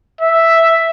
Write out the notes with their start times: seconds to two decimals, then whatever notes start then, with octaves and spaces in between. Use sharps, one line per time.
0.21 E5